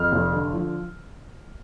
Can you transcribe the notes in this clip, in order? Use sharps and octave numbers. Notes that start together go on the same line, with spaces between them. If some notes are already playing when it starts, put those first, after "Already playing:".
Already playing: F2 F6
F1
D3
F3